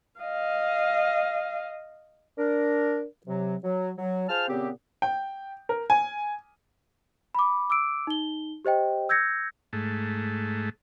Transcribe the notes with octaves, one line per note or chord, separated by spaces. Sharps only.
D#5 F5
D4 A#4
C3 F#3
F#3
F#3
F4 G#4 C5 A5 F6
A#2 C#3 B3 C4 G4
G5
A#4
G#5
B5 D6
D6 E6 D7
D#4 G7
G4 C5 D#5 G5
E6 G6 G#6 A#6 C#7
G#2 A3